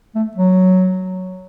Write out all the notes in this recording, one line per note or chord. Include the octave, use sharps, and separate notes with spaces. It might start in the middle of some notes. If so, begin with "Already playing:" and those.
A3
F#3